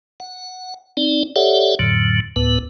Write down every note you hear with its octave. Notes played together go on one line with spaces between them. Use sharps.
F#5
C4 D#4 D5
G4 A4 C#5 D5 E5 F#5
F2 A2 D3 F#3
D2 A2 B3 B4